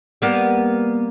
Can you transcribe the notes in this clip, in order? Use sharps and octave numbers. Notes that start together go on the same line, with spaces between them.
G3 A#3 B3